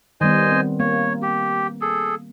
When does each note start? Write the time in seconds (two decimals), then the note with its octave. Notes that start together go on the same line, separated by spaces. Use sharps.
0.21 D#3 G3 B3 C5 D#5 G#5
0.52 C4
0.80 A#3 C#5
1.22 G4
1.81 G#4 A4